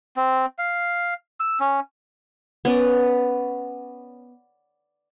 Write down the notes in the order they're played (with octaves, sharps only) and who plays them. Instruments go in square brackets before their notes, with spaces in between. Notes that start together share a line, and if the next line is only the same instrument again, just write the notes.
[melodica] C4
F5
E6
C#4
[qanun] B3 C#4 D5